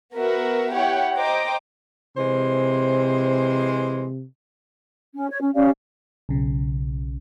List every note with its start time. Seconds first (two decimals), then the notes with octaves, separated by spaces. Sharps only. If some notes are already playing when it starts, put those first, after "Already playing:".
0.15 B3 F#4 A#4 B4 E5
0.75 E4 G4 C#5 F#5
1.16 C5 D#5 G5 A#5 D6
2.17 C3 E3 G#3 C5
5.15 C#4
5.30 C#5
5.41 C#4
5.54 C#4 G4 D5 F5
6.29 B1 C#3